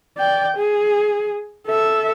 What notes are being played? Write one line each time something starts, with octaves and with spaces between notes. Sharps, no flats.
D5 G5
G#4
A4 E5